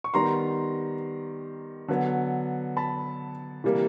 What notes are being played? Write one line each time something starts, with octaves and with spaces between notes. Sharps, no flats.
C#6
D#3 G3 B3 A#5 C6
D3 F#3 B3
A5 B5
C3 E3 G3 A#3